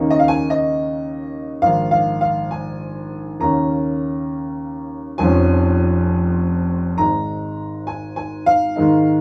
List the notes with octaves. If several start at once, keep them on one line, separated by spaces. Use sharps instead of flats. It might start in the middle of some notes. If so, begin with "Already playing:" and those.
Already playing: D#2 C#3 A#3 D#4
D#5
F5
G#5
D#5
A#1 G#2 D#3 F5
F5
F5
G#5
D#2 C#3 A#3 C#4 A#5
F1 F2 F3 C#4 G#5
G#1 G#2 G#3 D#4 A#5
G#5
G#5
F5
G#2 D#3 G#3 D#4